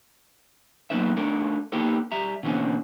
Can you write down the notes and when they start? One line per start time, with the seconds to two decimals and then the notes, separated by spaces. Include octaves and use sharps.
0.90 F#3 A#3 B3 D#4 B4 E5
1.16 A3 D4 D#4 A4 A#4
1.72 A#3 B3 D#4 G4 A4 A#4
2.12 G3 E5 A#5
2.43 B2 D3 E3 A#3 C4 C#4